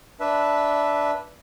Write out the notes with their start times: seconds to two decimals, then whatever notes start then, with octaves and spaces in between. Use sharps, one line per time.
0.20 D4 B4 E5